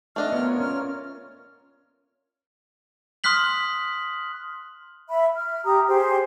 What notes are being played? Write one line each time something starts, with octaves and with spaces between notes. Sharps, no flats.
A3 D4 D#5 F6
B3 F4 A#4 C#5
C#4 F6
C6 D#6 F6 F#6 B6 F#7
E5 B5
F6
G4 A#5 D#6
G4 G#4 C5